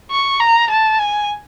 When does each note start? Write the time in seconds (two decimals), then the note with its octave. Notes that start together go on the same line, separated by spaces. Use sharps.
0.11 C#6
0.40 A#5
0.70 A5
1.00 G#5